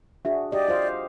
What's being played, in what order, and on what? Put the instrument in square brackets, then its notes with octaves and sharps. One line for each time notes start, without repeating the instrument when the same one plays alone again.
[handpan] D4 F#4 G#4 [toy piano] E5
[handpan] G4 D#5 [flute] D5
[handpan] F4 C5 F5